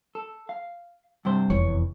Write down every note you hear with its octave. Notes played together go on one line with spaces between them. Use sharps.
A4
F5
G2 C3 C5
F1 E2 C#5